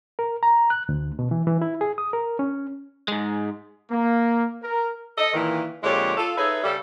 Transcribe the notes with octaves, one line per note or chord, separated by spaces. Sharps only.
A#4
A#5
F#6
D2
B2
E3
E3
E4
G#4
D#6
A#4
C#4
G#2 G#3
A#3
A#4
A4 D#5
A#2 D#3 E3
F2 A#2 D3 G#3 G4 C#5
F4 A4
D#4 G#4 A4 B4 C#5 E5
C#3 G3 A4